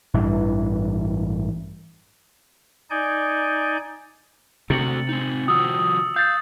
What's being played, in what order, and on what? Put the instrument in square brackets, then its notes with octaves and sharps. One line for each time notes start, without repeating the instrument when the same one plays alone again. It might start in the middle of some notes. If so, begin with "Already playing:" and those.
[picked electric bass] A1 G2 E3
[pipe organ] D#4 D5 G#5 G6
[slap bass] C3 [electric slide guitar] A3 F#4 [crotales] A6 C#7 F#7
[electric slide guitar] C4 D#4
[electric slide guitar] D#3 F3 F#4 [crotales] D#6 E6
[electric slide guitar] F5 [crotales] G6 A6 C7